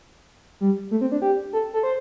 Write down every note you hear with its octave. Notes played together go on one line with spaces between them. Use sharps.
G3
A3
C4
D4
G4
A4
A4
C5